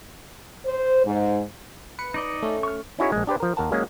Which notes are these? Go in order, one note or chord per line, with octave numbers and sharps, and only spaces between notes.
C5
G#2
B4 C#7
D#4 D5 D#5
A3 C#4
C#6 F6
C#4 D#4 E4 F#4 G#4 C#5
A#1 G#3
D4 G4 B4 C5
F3 A#4
D#2 A#4 F#5 A5
F#3 G#3 A#3 C#4 G#4